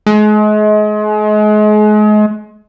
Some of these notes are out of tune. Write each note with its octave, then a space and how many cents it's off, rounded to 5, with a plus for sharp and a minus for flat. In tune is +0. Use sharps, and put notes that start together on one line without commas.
G#3 +35